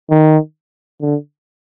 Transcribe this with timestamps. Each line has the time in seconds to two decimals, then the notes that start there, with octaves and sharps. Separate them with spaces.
0.10 D#3
1.01 D3